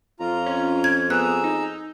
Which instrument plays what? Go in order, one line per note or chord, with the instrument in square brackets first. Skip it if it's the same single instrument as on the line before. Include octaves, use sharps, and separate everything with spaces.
[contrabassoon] F2 [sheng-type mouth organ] F4 A#5
[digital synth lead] C#4
[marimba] G#6
[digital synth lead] B3 [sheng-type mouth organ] G#4 A#5 E6 [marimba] F#6
[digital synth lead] D#4